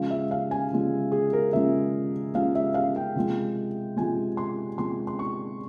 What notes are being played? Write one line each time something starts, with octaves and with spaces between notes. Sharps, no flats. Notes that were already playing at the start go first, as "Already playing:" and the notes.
Already playing: C#3 F3 G#3 F5
E5
F5
G#5
C#3 F3 G#3
G#4
A#4
C#3 F3 G#3 E5
C#3 F3 G#3 F5
E5
F5
G5
C3 F3 G#3
C3 F3 G#3 G#5
C6
C3 F3 G#3 C6
C6
C#6